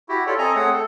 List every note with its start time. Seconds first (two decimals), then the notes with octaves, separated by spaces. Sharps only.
0.09 E4 F#4 G4
0.27 F4 G4 A4 C#5 D5
0.38 C4 A4 D#5 G#5 A#5
0.55 A3 C4 G#4 C#5 F#5
0.72 A4